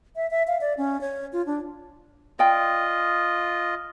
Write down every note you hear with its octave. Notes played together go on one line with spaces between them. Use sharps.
E5
E5
F5
D5
C#4
C#5
F4
D4
F4 D5 D#5 G5